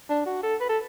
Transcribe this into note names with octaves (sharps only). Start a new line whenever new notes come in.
D4
F#4
A4
B4
A4